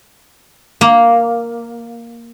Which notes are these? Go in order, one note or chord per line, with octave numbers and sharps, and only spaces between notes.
A#3